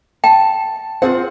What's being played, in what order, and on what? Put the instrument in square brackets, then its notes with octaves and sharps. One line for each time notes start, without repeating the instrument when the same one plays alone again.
[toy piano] G5 [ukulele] A5
[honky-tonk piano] C4 [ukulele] F4 G#4 F#5